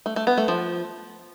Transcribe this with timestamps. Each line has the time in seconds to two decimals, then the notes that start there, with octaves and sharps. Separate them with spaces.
0.06 A3
0.16 A3
0.27 B3
0.38 A3
0.48 F3